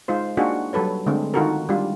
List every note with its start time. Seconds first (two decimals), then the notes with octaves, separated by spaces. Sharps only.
0.08 G#3 D#4 F4 C5
0.37 A#3 D4 D#4 F4 F#4 G#4
0.73 F#3 G3 A4 B4 C#5
1.06 D3 G#3 A3 C4
1.34 D#3 D#4 F4 F#4 A4 A#4
1.69 G3 G#3 D4 F4